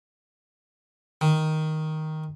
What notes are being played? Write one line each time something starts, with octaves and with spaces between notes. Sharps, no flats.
D#3